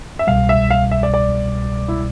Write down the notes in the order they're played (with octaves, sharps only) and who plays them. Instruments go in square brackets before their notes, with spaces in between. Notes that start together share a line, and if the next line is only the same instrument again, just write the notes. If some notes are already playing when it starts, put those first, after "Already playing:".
[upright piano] E5
[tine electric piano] C2 B2 G3 [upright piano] F5
[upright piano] E5
F5
E5
D5
D5
E4